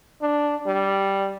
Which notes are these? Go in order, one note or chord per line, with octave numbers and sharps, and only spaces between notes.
D4
G3